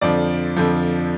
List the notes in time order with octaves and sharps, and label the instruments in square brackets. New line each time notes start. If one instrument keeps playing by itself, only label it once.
[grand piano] F2 D3 F3 D5
F2 D3 F3